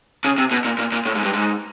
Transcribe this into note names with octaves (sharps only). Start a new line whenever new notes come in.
C#3
C3
B2
A#2
A#2
A#2
A2
G#2
G2
G#2